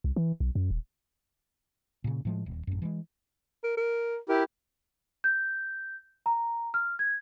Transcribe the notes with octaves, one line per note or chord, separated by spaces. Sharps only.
C2
E3
B1
F#2
D#1
A#2 C#3
A2 F3 G#3
D#1
A1 F#2
E3 G3 G#3
A#4
A#4
E4 G4 A#4
G6
A#5
F6
G#6